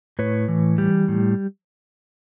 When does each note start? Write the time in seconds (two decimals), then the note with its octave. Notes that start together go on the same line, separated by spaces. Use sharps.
0.19 A2 B4 C#5
0.48 E3
0.78 G3
1.08 A2